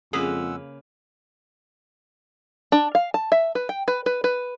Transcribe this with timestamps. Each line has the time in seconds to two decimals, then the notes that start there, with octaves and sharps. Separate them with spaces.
0.13 F2 C#3 G#3 A#3 G#4 B4 F#5 E6
2.72 D4
2.95 F5
3.14 A5
3.32 E5
3.55 B4
3.69 G5
3.88 B4
4.06 B4
4.24 B4